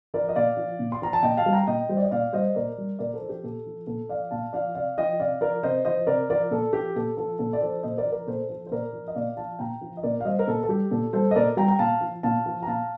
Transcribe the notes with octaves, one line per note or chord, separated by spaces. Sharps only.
F3 A#4 D5
D#5
A#2 D5 F5
F3
A#2
C6
F3 A#5
A5
A#2 D#5 G5
F5 A5
G3
G5 A#5
A#2 D#5 G5
G3 C5
D5
D#5
A#2 D5 F5
G3 C5 D#5
A#2 A#4 D5
G3
A#2 A#4 D5
A4 C5
F3
G4
A#2 A4
F3
A#2 A4
F3 D5 F5
A#2 F5 A5
F3 D5 F5
C3 D5 F5
F3 D#5 G5
C3 D5 F5
F3 A#4 D5
C3 C5 D#5
F3 C5 D#5
C3 A#4 D5
F3 A#4 D5
A#2 A4
F3 G4
A#2 A4
F3 A4
A#2 A4
D5
F3 A4 C5
A#2 C5 D#5
A#4 D5
F3
A#4 D5
A#2 A4 C5
F3 A4
C5
A#2 A#4 D5
F3
D#5
A#2 D5 F5
F3 F5 A5
A#2 G5 A#5
F3
D#5
A#2 A#4 D5
F5
G3 C5 D#5
A#4
A#2 A4
A4
G3 G4
A#2 A4
G3 A4 C5
D#5
A#2 A#4 D5
G3 G5 A#5
G5 A#5
A#2 F5 A5
F3
A#2 F5 A5
F3
A#5
A#2 F5 A5